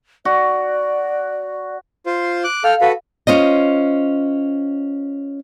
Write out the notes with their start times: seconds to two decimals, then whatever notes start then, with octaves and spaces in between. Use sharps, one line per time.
0.25 F#4 D5
2.06 F4 C5
2.44 D6 F#6
2.64 A4 F5 G5 F6
2.81 F#4 A4 B4
3.27 C#4 F4 C5 D#5